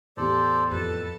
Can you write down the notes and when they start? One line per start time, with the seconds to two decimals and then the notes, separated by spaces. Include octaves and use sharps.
0.17 E2 A2 G4 A4 C5 D5
0.71 F2 A4 B4